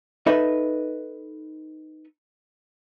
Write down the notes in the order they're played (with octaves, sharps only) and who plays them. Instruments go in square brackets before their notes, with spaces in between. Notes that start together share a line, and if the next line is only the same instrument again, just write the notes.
[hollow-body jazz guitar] D#4 A4 B4 D#5 E5